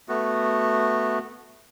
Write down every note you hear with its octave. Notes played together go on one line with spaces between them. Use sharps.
A3 B3 F#4